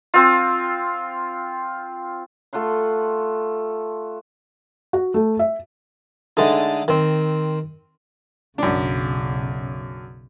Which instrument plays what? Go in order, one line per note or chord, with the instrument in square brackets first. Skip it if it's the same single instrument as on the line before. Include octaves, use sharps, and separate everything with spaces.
[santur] C4 F4
[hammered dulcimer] A3 F4 F#5 C6
[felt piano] F#4
A3
E5
[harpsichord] D3 G#3 A3 D#4
D#3 C4
[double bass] B1 C#3 [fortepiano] F#2 D4